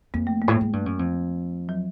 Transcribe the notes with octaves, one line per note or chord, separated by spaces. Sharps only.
F2 A#3
A3
A#3
A2
G#2 A3
G2
F#2
F2
F#3